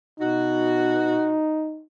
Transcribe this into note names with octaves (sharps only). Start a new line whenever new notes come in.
B2 D#4 F#4